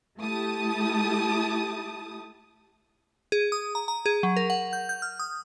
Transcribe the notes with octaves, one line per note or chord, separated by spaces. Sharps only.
A3 E4 G4 A5 D#6
G#4
D#6
A#5
A#5
G#4
F#3
A#4
F#5
G6
G6
F6
D#6